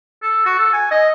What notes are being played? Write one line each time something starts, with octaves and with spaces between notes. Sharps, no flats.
A4
F#4
A4
G#5
D#5